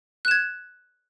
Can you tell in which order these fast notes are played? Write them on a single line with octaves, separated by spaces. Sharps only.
F#6 E7 G#6